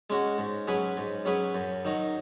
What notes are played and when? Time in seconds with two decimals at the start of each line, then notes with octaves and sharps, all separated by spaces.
0.10 G#3 C#4 F#4
0.38 G#2
0.68 F#3 C#4 G#4 B4
0.97 G#2
1.25 F#3 C#4 G#4 B4
1.55 F#2
1.85 D#3 F#3 D#4